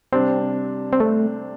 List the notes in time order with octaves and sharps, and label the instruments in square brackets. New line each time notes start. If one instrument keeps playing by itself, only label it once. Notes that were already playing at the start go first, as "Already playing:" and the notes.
[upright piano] C3 G3 D4 C5 [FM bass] C4
[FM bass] C4
A3